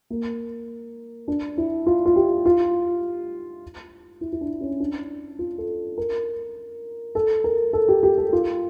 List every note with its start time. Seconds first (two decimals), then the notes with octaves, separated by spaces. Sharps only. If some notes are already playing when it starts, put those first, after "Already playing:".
0.10 A#3
1.28 D4
1.58 E4
1.86 F4
2.05 F4
2.16 G4
2.45 F4
4.21 E4
4.32 E4
4.41 D4
4.61 C#4
4.80 D4
5.39 F4
5.58 A4
5.98 A#4
7.15 A4
7.44 A#4
7.73 A4
7.88 G4
8.03 G4
8.18 A4
8.33 F4